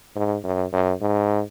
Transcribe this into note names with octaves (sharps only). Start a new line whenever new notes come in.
G#2
F#2
F#2
G#2